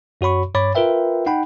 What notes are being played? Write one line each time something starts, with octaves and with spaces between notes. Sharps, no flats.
F#2 F#4 C#5 B5 C#6
G2 C#5 B5 D6 A6
F4 A#4 B4 E5 G5
D#4 F#5 G5 B5